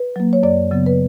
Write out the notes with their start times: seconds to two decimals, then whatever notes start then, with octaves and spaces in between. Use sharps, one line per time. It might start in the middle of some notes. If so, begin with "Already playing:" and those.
Already playing: B4
0.16 F#3 A#3
0.33 C#5
0.43 F#2 D5
0.71 C#3 F#3 B3
0.86 B4